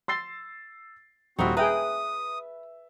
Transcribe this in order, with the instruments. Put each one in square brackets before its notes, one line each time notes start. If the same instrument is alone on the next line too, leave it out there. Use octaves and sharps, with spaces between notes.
[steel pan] C6 [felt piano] E6 A6 C7
[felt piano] D#1 [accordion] C4 F#4 [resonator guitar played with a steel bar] D#4 E4
[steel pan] G#4 G5 A#5 [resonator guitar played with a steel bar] B4 [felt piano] E5 [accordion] D#6